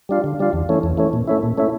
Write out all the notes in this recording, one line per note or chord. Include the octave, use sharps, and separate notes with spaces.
G3 D4 F4
D3
G3 D4 F4
E2
E3 A3 C#4
E2
E3 A3 C#4
A#2
A3 C#4 E4
A#2
A3 C#4 E4